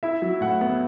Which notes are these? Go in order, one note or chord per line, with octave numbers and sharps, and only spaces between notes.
E4 E5
F#3
A2 F#5
B3